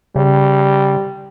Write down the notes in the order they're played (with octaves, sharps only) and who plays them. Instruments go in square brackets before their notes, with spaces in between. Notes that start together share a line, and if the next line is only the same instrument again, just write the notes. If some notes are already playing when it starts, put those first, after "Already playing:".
[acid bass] C#3 [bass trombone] G3